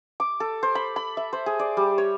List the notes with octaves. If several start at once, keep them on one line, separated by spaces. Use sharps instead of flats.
D6
A4
C5
B5
B5
E5
C5
G#4
D5
G3
C#5